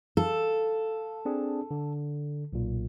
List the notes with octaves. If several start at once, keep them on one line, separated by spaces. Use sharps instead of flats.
A4 F5
C4 D4 G#4
D3
B1 A#2